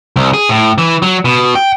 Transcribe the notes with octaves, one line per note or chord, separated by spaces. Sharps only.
C2
G#4
A2
E3
F#3
B2
G5